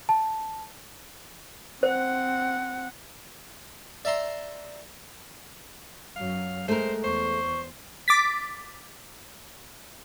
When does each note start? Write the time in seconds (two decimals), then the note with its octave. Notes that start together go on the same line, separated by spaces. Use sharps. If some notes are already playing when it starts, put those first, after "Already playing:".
0.09 A5
1.83 C4 C5 F#5
4.05 D5 E5 A#5 C6
6.16 F#2 F#3 F5
6.68 G#3 A3 A#4 C5
7.04 E2 C5 C#6
8.08 D6 A6 B6